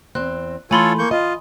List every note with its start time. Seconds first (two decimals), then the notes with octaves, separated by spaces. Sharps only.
0.15 E2 C4 F#6
0.71 E3 A3 F4 A4 C#5 G#5 B5 C6
0.98 A#3 C#6 G6
1.11 F4 D#5